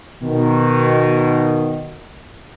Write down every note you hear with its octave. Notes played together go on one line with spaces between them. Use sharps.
B2 D#3